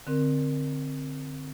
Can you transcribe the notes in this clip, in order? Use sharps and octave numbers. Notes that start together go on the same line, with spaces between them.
D3 C4 A#4